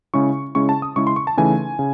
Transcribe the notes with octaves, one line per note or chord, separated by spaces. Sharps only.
C#3 G#3 C#4 E4 C#6
C#3 G#3 C#4 E4 C#6
A5
D#6
C#3 G#3 C#4 E4 C#6
C6
C#6
A5
C#3 E3 A3 D#4 G#5
C#3